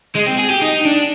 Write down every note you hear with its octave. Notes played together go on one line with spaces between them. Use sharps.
G#3
C4
G#4
G4
D#4
D4